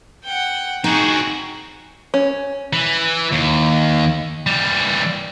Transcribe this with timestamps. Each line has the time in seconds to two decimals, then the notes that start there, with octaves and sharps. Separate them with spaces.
0.24 F#5 G5
0.84 C4 D#4 F#4 G#4 C#6
2.14 C#4
2.73 E3
3.32 D#2
4.46 E3 G3